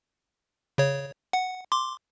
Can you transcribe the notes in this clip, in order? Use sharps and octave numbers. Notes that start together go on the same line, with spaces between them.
C#3 C#5
F#5
C6 D6